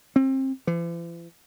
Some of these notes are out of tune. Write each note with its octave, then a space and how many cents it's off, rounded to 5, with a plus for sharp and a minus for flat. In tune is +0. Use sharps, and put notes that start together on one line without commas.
C4 +30
E3 +45